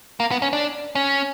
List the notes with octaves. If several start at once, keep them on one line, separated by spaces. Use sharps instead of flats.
A#3
B3
C#4
D4
C#4